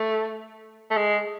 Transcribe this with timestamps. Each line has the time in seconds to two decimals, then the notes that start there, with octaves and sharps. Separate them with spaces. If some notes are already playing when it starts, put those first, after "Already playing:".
Already playing: A3
0.90 A3
0.97 G#3